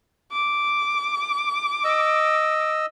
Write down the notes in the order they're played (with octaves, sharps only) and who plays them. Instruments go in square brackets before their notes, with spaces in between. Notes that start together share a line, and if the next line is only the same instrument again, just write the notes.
[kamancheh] D6
[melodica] D#5 E6